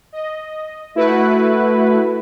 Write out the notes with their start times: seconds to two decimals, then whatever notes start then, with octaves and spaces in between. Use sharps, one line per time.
0.12 D#5
0.95 A3 E4 F#4 B4